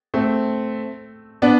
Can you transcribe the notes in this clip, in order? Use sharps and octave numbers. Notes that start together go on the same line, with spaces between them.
A3 C4
B3 D4